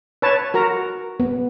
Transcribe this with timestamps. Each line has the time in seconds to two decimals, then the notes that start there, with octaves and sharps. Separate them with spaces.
0.22 B4 C#5 A5
0.54 F#4 A#4 A#5
1.20 B3